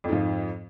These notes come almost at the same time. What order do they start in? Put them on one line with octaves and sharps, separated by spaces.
F2 G#2 F3